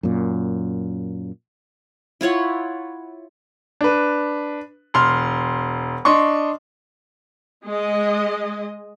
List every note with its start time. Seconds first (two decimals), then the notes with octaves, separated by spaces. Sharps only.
0.03 F#2 A#2
2.21 E4 F4 C#5 F#5
3.81 D4 B4
4.94 E1 C6 F6
6.05 D4 D#5 C6 C#6
7.66 G#3 D#5